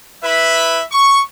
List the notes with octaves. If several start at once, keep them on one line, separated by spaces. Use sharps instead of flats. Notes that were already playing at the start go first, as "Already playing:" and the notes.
E4 B4 E5 B5
C#6